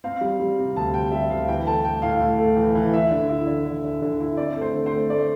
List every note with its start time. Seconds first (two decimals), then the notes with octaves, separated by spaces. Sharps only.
0.04 C4 F5
0.21 G3
0.40 G3
0.58 C3
0.76 D2 A5
0.94 C4 G5
1.12 G3 E5
1.30 D2 F5
1.48 E3 G5
1.66 A3 A5
1.85 A3 G5
2.02 A2 F5
2.21 A2
2.39 A3
2.57 E3
2.75 E3
2.94 E4 E5
3.11 D3
3.29 E4
3.47 D3
3.66 D3
3.84 D3
4.02 D3
4.20 E4
4.37 C4 D5
4.56 A3
4.61 C5
4.74 D3
4.86 C5
4.92 A3
5.10 A3 D5